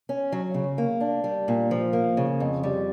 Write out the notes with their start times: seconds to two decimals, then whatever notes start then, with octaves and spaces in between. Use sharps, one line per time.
0.09 C#4
0.32 F#3
0.54 C#3
0.78 A#3
1.00 D4
1.24 G3
1.48 A#2
1.71 F3
1.93 A#3
2.17 C#3
2.40 F2
2.63 G3